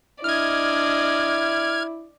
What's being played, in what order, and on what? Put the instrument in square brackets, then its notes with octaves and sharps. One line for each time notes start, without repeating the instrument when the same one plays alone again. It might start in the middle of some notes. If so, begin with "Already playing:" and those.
[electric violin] D4 D#5 [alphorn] E4 [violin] D5 [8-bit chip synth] F6 G#6